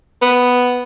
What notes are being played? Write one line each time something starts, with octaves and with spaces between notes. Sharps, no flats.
B3